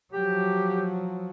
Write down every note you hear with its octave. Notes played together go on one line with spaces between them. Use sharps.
F3 F#3 G4